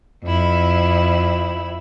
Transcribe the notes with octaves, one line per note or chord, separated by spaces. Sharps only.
F2 E4